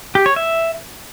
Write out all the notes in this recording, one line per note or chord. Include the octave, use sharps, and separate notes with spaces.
G4
C#5
E5